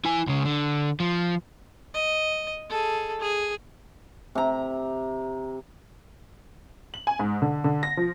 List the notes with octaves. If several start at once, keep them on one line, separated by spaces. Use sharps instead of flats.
E4 G#5
C#2 C#3
D3
F3
D#5
G#4 A4
G#4
C3 A#5
F#7
G#5
G#2
D3
D3
A#6
F3